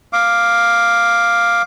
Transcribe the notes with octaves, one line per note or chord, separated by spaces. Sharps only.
F5 D6